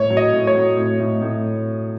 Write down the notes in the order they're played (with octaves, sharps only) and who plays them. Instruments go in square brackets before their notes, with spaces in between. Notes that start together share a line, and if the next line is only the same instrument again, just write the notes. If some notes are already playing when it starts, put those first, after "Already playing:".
Already playing: [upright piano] A2 [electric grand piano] C#5
[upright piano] F#3
[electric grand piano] D#5
[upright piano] A2
[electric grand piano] C#5
[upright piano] F#3
A2
A2
A2